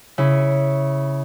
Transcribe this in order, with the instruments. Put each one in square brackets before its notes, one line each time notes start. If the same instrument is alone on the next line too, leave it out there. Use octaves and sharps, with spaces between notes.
[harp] C#3 E4